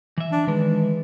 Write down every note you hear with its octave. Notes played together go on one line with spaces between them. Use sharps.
E3 E5
D4
D#3 E3 G#3